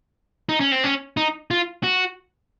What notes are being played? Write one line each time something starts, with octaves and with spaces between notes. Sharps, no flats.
D#4
C#4
C4
C#4
D#4
F4
F#4